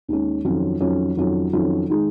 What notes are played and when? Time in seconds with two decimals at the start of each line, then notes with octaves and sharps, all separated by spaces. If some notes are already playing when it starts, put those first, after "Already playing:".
0.08 D#2 D#3 G#3 C#4
0.45 F2 D#3 F#3 C#4 F4
0.81 F2 D#3 F#3 C#4 F4
1.17 F2 D#3 F#3 C#4 F4
1.53 F2 D#3 F#3 C#4 F4
1.90 D#3 G#3 D#4